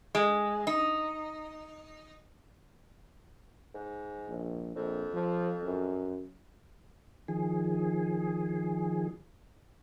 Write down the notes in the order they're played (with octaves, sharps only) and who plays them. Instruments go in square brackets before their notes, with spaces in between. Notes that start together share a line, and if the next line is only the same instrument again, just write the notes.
[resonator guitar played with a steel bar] G#3
D#4
[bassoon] G#2
[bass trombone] A#1
[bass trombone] A#1 [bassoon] F2
[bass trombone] F3
F#2
[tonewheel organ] D#3 F3 G#4